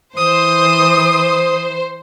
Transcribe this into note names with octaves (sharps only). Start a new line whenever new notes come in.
E3 C5 D#6